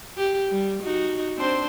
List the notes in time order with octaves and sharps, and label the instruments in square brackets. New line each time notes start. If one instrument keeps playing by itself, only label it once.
[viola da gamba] G4
G3
D#4 F#4
C4 D4 C5